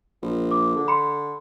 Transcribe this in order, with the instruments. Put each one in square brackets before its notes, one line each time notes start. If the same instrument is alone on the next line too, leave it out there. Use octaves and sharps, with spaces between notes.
[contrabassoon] A#1
[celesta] D6
[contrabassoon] D3
[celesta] B5 C6 C#7